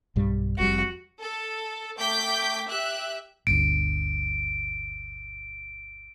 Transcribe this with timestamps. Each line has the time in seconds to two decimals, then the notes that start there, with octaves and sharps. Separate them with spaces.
0.16 B1 G2 G3
0.58 F1 F2 G3 F#4
1.21 A4
1.98 A3 G5 D6 G6 B6
2.68 G4 E5 F#6
3.47 G1 D2 D7